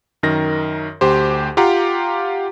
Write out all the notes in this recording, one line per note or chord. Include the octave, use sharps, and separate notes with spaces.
F#2 D#3 A#4 A#6
D2 G4 C5
F4 G4 F5 F#5 A#5